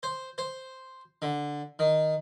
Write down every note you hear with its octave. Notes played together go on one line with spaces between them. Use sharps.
C5
C5
D3
D#3